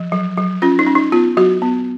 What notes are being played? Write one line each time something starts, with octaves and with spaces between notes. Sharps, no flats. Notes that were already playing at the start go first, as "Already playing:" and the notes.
Already playing: F3
F#3
F#3
C#4 F4
D#4
C#4
D#4
B3 F4
F#3 F#4
B3